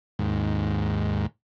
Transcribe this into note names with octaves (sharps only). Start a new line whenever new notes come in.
D#2 G#2